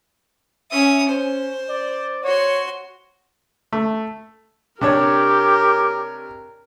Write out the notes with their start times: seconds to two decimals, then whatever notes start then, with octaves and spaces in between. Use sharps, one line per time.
0.71 C#4 E5 D#6
1.09 C#4 C5
1.69 D5
2.24 F#4 C#5 C6
3.73 A3
4.81 C3 D4 G4 A#4 C#5